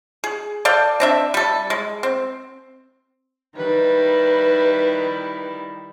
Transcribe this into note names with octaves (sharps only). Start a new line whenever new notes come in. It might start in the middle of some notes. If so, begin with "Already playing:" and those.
G#4
A4 D5 F5 G5
C4 D4 E5
G3 A4
G#3
C4
D#3 G3 E4 B4